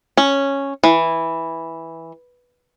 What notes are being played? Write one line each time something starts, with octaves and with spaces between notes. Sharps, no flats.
C#4
E3